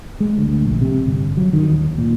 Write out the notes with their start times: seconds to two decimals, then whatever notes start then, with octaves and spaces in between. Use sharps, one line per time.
0.20 G#3
0.38 D2
0.65 A#1
0.81 C3
1.06 G1
1.37 F#3
1.53 D#3
1.70 D#2
1.98 A#2